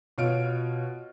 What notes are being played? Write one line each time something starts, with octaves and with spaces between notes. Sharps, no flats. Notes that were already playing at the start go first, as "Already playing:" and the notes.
B2 F4 C#5 F6 D7